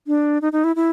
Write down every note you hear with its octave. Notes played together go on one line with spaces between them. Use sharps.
D4
D#4
D#4
E4
E4